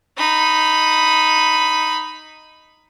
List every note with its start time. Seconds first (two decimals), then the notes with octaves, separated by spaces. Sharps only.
0.17 D#4 B5